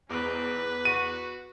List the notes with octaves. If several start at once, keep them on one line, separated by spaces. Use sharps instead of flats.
E2 G#2 B2 C4 B4
F#4 D#7